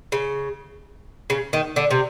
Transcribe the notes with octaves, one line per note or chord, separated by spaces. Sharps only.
C#3
C#3
D#3
D3
C3